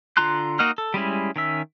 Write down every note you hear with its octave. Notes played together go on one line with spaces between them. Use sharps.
D3 F4 A#5 C6 F#6
A#3 D#4 F#4 D#5 F6
A4
G3 G#3 C#4 E4
D#3 C#4 E5